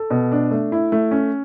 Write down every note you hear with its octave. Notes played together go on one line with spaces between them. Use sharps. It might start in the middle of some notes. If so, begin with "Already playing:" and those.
Already playing: A4
B2
D4
A3
E4
A3
C#4